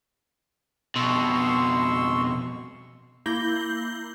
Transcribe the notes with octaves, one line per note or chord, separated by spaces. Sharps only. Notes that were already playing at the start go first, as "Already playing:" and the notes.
F2 B2 C6 C#6 E6
A#3 E4 G6 A#6 G7